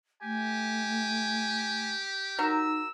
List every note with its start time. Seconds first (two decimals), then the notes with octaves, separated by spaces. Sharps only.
0.23 A3 G4 G#5
2.39 F#3 D#4 A#4 E6